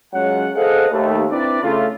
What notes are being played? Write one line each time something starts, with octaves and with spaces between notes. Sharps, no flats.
F#3 G#3 C#4 F4 F#5
G#4 A4 C5 D#5 F5 F#5
D#2 A3
C4 D4 E4 B4 D5
C#3 A3 F4